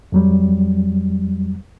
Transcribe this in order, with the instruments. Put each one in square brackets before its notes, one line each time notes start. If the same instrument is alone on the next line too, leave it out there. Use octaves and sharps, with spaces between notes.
[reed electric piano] F2 F#3 G3